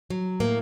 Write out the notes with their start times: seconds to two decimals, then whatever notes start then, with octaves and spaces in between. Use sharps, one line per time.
0.10 F#3
0.40 A2 A#3